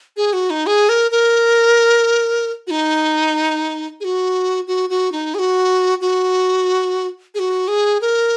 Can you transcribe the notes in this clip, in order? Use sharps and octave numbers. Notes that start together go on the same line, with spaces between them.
G#4
F#4
D#4
G#4
A#4
A#4
F#4
D#4
G#4
F#4
F#4
F#4
D#4
G#4
F#4
F#4
G#4
F#4
G#4
A#4